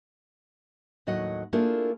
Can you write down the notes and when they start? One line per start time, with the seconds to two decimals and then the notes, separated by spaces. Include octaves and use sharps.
1.07 D#2 A2 F#3 D#5 F#5
1.53 A3 A#3 D4 E4 F4 G#4